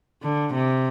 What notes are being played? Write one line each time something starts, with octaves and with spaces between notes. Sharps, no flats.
D3
C3